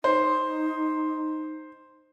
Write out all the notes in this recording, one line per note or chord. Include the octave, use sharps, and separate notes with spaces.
D#4 C5